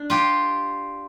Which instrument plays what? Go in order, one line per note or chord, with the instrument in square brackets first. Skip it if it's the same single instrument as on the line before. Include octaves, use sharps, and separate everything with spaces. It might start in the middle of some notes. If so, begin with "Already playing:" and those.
Already playing: [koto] D4
F4 G4